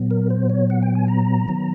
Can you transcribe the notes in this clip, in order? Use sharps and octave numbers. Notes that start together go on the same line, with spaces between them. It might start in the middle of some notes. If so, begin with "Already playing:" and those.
Already playing: A#2 F#3 B3
A#4
C5
C#5
F#5
G5
G#5
A#5
D#3 F#3 B3